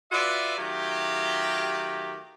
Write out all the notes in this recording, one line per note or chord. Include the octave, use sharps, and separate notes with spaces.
F4 F#4 A4 B4 D5 E5
D#3 F#3 A3 F4 G4